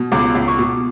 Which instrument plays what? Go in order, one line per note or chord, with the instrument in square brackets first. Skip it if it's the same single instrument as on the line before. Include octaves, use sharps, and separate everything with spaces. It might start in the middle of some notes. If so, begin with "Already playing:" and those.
Already playing: [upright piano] B2
C#2 D6
C#2
C#6
B2